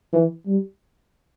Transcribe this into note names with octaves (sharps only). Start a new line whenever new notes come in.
E3
G3